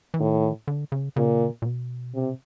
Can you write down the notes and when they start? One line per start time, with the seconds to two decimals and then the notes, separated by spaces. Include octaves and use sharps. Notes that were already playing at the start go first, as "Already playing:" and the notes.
0.14 E3
0.19 A2 D#3
0.68 D3
0.92 C#3
1.16 A#2 C#3
1.62 A#2
1.66 B2
2.14 C3